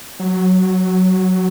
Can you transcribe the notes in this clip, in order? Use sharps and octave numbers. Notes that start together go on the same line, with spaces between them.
F#3